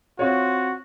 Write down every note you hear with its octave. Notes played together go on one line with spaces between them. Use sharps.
C4 F4 F#4 C#5